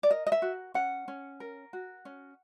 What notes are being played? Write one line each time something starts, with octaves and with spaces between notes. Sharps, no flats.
D5
A#4 D#5
D#5
E5
F#4
C#4 F#5
C#4
A#4
F#4
C#4